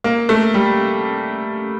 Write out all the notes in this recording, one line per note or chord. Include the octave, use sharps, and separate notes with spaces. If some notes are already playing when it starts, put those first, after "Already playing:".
A#3
A3
G3